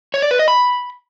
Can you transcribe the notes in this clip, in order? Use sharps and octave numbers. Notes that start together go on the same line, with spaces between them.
C#5
D5
B4
D#5
B5